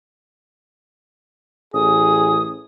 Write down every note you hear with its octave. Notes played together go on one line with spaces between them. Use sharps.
A1 G#4 D#6